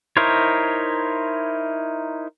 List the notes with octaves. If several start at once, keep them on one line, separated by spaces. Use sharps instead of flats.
D#4 E4 A#4 C5 C#5